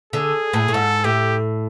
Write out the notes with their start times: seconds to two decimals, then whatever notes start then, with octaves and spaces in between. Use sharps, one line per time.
0.13 D3 G#4
0.53 A2
0.68 A2
0.73 G#2 A4
1.04 A2 G4